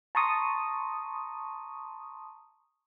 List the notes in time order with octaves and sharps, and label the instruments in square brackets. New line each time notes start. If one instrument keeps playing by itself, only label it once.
[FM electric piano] A5 A#5 C6 C#6 D#6